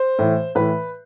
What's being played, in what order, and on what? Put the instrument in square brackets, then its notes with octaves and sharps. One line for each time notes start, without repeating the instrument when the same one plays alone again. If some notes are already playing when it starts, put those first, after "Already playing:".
Already playing: [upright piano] C5
A2 E3
A2 E3 B4